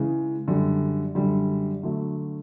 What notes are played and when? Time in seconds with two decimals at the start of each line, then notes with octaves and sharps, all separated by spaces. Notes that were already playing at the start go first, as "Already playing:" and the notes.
Already playing: C#3 E3 G#3
0.48 F#2 D3 G3
1.15 F#2 D3 G3
1.83 D3 F#3 A3